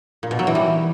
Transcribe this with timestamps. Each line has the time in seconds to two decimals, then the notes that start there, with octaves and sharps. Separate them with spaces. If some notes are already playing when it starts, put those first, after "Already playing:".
0.23 A#2
0.31 B2
0.39 F#3
0.47 E3
0.55 G3